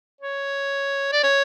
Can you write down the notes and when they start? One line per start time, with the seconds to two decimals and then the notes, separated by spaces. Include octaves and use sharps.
0.21 C#5
1.13 D5
1.24 C#5